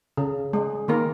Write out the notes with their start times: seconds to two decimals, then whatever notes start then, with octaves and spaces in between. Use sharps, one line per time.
0.17 C#3
0.53 G#3
0.88 D#3 A#3 A#4